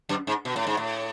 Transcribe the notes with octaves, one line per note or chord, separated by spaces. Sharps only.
F#2
G#2
B2
A2
G#2
A2